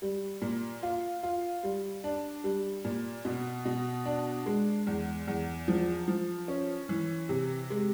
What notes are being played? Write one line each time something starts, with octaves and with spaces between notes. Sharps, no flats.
G3
A#2
F4
F4
G3
D4
G3
A#2
B2
B2
D4
G#3
E2
E2
F3
F3
C#4
E3
C3
G#3